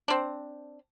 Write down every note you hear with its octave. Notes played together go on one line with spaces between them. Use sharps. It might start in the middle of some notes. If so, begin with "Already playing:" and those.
C4 D4